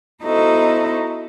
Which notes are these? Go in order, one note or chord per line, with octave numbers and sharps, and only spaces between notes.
B3 D#4 E4 F#4 A4 C5